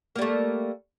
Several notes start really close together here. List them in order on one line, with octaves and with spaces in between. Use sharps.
A#3 G3 A3